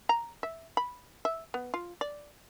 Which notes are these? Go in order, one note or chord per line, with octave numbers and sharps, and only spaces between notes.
A#5
E5
B5
E5
B3
F4
D5